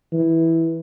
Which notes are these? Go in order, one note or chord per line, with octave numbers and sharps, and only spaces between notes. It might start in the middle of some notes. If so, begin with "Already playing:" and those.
E3